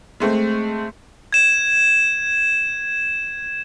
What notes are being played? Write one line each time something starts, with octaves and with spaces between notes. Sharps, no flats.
G#3 A3 C4
G#6 E7